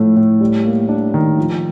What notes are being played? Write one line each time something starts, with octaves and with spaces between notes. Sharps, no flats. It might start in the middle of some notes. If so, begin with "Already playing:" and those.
Already playing: A2 F3 A3
A2
G3
A#3
D4
D#3
F3